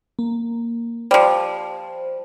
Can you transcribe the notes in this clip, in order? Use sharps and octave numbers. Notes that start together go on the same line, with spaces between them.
A#3
F3 G3 C5